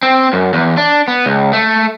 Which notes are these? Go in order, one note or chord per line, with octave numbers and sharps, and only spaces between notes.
C4
F#2
E2
D4
B3
C#2
A3